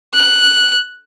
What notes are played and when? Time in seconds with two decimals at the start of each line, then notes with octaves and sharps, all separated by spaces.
0.14 F#6